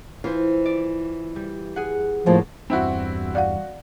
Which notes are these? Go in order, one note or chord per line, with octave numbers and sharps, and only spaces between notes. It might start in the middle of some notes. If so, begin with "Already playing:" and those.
E3 F4 C5
D5
G3
G#4 F#5
D2 A2 F3 A#3
E2 G2 C4 E4 F#4
F#4 D5 F5 F#5